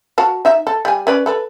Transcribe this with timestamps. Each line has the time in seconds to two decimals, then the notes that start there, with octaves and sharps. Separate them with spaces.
0.18 F#4 F5 A5
0.45 D#4 E5
0.67 A4
0.85 G3 G#5
1.07 C#4 B4 D5
1.26 A4 B4